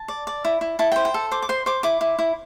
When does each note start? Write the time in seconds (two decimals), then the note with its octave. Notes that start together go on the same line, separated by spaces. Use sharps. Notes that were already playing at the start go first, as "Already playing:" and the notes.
Already playing: A5
0.08 D5
0.27 D5
0.45 E4
0.61 E4
0.79 E4 A5
0.92 G5
0.96 C5
1.05 G5
1.14 A4
1.32 C5 D6
1.42 D6
1.49 C5 C6
1.66 C5 D6
1.83 E4 D6
2.01 E4
2.19 E4